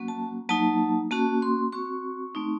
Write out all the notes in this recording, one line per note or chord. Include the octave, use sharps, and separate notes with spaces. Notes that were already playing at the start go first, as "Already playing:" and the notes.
Already playing: F#3 A#3 C#4 F#4
A5
F#3 A#3 D#4 A5
A#3 C#4 F#4 A5
C6
C4 F#4 C#6
A3 C4 D#4